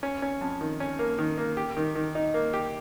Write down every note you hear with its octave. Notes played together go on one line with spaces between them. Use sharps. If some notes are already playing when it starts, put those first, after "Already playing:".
C#4
C#4
F2
D#3
C#4
A#3
D#3
A#3
G4
D#3
D#3
D#4
A#3
G4